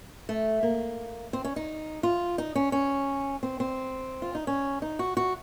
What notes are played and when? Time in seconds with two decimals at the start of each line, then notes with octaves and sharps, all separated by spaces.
0.29 A3
0.63 A#3
1.33 C4
1.45 C#4
1.56 D#4
2.03 F4
2.38 D#4
2.55 C#4
2.72 C#4
3.43 C4
3.60 C4
4.22 F4
4.35 D#4
4.47 C#4
4.82 D#4
4.99 F#4
5.17 F#4